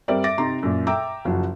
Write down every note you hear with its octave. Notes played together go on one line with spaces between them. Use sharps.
G3 C4 A#4 D5 E5
E5 D6 A6 A#6 D7
C3 D#4 A#5 C6
F#2 A#2
E5 G5 A#5 D6 E6
F#1 F3 F#3 F#4